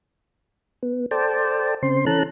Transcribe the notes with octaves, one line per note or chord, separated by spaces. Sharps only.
B3
A4 C5 D5 G5 A5
C#3 C4 C5 C6
E3 C#4 A4 A5 A#5 F#6